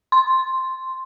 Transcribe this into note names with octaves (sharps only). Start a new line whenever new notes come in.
C6